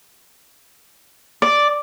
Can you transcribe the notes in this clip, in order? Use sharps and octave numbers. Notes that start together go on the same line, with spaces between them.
D5